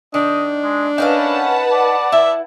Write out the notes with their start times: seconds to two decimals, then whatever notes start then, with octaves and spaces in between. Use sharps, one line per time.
0.14 D#3 D4 D#5
0.64 G#3
0.98 C#4 D#4 A#4 B4 F5 F#5 A5
1.72 D5
2.12 E4 E5